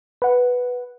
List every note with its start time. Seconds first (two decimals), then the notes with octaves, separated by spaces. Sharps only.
0.22 B4 F#5